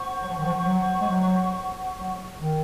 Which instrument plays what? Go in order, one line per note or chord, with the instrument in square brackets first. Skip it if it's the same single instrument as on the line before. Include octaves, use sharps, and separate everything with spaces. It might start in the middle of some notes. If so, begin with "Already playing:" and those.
Already playing: [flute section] C5 F#5 C#6
[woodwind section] F#3
F3
D#3
F3
F#3
G#3
F#3
F#3
D#3